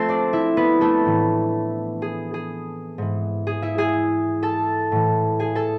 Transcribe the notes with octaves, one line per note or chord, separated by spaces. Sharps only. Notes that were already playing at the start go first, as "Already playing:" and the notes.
Already playing: F3 A3 C4 A4 C5
D4 D5
E4 E5
B3 B4
A3 A4
A2 E3
G#4
G#4
G#2 E3
G#4
E4 E5
G#4 G#5
A4 A5
A2 E3
G#4 G#5
A4 A5